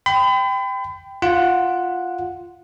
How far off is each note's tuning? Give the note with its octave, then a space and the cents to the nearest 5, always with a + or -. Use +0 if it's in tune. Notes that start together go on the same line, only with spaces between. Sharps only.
G5 +0 B5 +40
F4 +0 F#5 -10